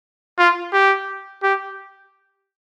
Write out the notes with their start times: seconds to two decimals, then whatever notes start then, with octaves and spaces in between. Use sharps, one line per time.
0.38 F4
0.73 G4
1.43 G4